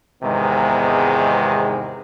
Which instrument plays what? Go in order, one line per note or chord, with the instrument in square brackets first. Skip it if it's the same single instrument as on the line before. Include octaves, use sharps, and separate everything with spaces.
[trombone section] E2 G#2 C3 D#3 G#3 B3